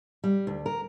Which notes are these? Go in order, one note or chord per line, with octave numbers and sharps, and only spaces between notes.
G3
D2
A#4